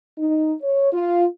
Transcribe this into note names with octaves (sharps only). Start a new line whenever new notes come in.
D#4
C#5
F4